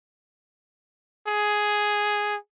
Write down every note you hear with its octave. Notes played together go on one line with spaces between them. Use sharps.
G#4